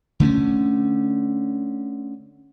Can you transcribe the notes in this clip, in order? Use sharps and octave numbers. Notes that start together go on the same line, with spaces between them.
D3 A3 B3 C#4